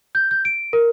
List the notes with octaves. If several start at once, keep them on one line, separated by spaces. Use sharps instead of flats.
G6
G6
D7
A#4